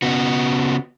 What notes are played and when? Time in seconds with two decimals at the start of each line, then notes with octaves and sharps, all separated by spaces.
0.02 C#3 B3 F#4